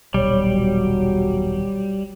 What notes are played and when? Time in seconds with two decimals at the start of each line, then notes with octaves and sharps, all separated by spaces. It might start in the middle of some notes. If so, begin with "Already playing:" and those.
0.14 D#1 B1 G3 C#5
0.50 F#3